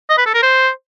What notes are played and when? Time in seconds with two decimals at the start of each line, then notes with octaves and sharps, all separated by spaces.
0.09 D#5
0.18 B4
0.26 A4
0.34 A#4
0.42 C5